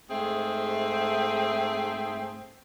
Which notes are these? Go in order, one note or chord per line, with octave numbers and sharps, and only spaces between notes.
G#2 A3 C4 G#4 E5